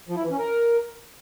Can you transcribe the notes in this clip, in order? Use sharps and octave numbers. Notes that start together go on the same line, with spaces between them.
F3
E4
E3
C#4
A#4